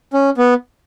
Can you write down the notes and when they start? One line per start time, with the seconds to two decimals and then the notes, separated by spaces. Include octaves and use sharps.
0.13 C#4
0.38 B3